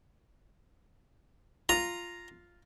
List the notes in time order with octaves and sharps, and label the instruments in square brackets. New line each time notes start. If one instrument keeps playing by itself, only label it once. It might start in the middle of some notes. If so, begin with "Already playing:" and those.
[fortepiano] F4 [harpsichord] A#5